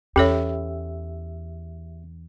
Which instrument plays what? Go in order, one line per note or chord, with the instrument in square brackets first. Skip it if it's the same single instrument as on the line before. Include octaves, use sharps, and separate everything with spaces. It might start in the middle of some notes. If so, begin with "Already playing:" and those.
[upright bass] E2 [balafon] C#4 A4 C#5 [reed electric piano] G4 E5